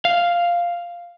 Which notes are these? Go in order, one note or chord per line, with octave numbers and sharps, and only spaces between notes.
F5